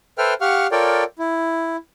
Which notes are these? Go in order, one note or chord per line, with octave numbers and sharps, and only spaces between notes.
A4 B4 C5 E5 G5 F6
G4 F5 F#5 C#6 F6
F4 A4 A#4 C#5 D5 G5
E4